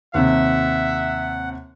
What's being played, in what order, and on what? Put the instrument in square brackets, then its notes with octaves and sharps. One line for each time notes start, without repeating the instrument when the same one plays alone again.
[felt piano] D#2 C3 [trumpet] E5 [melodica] F#5